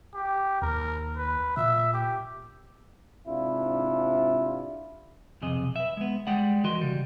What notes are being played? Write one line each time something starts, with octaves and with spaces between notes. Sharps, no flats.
G4
D#2 A#4
B4
A#2 E5
G4
G#2 C3 D4 E4 F4
B1 F2 C3 G#4 D#5
B4 E5
G#3 B3
G3 G#3 G4 D5 F#5
E3 F#4 A#4 D#5 C6
C#3 G3